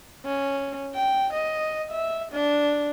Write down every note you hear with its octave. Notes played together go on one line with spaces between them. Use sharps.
C#4
G5
D#5
E5
D4